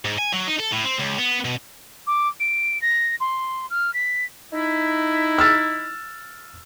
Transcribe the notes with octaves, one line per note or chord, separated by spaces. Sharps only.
G#2
G#5
F#3
D#4
A4
A2
C4
C#2
B3
B2
D6
D7
A#6
C6
F6
B6
D#4 E4
E6 F6 A6